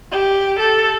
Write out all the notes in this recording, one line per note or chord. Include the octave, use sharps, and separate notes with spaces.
G4
A4